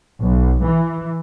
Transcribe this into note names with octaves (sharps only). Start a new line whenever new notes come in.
B1
E3